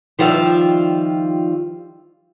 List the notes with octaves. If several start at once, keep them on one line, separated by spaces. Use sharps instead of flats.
D#3 F3 G3 F4 B4 E5